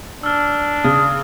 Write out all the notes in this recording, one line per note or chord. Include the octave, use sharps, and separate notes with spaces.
D4 E6 F6
C#3 D#6 F6